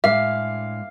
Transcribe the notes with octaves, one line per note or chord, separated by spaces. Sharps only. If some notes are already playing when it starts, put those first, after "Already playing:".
A2 G#3 D4 E5 F5